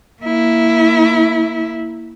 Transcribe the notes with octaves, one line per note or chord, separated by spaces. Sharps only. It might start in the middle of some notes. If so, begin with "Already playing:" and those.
A#3 E4